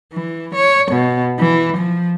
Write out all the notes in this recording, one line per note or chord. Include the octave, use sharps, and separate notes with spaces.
E3
C#5
B2
E3
F3